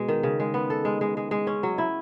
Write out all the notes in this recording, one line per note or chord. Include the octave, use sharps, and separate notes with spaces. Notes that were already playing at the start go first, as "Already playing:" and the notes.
Already playing: B2 G#3
D#3
C#3
G#3
B3
A4
G#3
G#3
G#3
G#3
C#4
F#3
E4